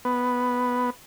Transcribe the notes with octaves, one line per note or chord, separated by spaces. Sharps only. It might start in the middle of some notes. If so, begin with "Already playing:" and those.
B3